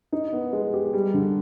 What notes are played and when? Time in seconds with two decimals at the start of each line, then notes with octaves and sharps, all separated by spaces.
0.12 D#4
0.33 B3
0.53 G#3
0.73 G4
0.93 G3
1.14 D3